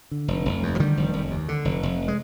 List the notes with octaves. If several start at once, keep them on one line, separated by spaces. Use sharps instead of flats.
D3
F1
F1
D#2
F3
D3 D#3 G3
F1
F1
D#2
D3
F1
F1
G#3